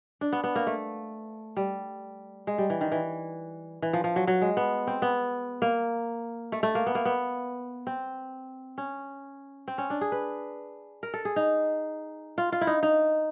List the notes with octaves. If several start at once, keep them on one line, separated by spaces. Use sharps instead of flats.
D4
B3
B3
A#3
A3
G3
G#3
G3
E3
D#3
E3
E3
F3
F3
F#3
F#3
G#3
B3
C4
B3
A#3
A3
A3
A#3
B3
A#3
B3
C4
C#4
C4
C#4
D4
G#4
B4
A#4
A4
G#4
D#4
F4
F4
E4
D#4
D#4